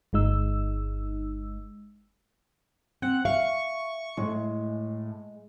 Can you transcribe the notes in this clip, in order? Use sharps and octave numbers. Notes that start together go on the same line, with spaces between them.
G1 G#3 D#4 E6
C4 F#5
E5 F5 C#6
A2 G#3